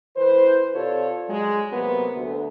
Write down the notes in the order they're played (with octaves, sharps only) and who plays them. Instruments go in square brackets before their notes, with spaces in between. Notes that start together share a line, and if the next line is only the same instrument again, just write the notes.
[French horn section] E3 B4 C5
C3 F4 A4 C#5 D5
F#3 G#3
C3 F#3 A#3 B3
D2